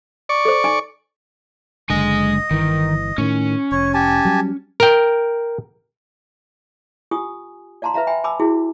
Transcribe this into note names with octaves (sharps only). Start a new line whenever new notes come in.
D5 C#6
A4 C5
D#4 G#5
F#1 D3 G#3 D#5 G#5
G1 D#3 E3
A2 D#3 C#4
F1 C#5
G4 G#5 A5
F#3 G3
A#4 G5
F4 G4 G#5 D#6
D5 F5 A5 A#5 C6
B4 E5 F5 A#5
E5 G5 G#5 B5
G#5 A5 B5 D6 E6
E4 F#4 G#4